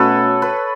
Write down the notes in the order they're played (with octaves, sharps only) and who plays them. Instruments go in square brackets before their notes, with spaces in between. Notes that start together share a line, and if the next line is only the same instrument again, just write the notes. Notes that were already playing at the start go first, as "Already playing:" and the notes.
Already playing: [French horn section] B2 A3 C#4 F#4 [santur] A4 B4 C#5
[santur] B4